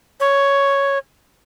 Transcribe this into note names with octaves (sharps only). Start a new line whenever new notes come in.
C#5